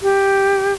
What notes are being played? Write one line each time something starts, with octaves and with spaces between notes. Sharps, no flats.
G4